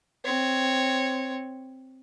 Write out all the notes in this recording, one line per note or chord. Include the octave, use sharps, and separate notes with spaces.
C4 C#5